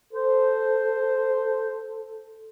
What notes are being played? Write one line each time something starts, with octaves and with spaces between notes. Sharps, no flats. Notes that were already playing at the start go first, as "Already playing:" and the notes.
A4 C5